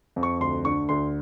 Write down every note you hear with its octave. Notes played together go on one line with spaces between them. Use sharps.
F2
C#6
D2 C6
D3 C#6
D2 C6